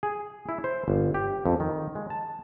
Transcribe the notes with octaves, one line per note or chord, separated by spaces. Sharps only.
G#4
E4
C5
G1
G4
F2
D#3
G#3
A5